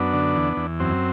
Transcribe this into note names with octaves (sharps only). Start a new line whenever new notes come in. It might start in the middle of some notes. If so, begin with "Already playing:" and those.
Already playing: F#2 B3 D4
D3
E2
E2
F#2 C4